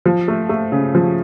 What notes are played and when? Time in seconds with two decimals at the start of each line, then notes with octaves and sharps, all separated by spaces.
0.06 F3
0.28 A3
0.49 A3
0.72 C#3
0.95 F3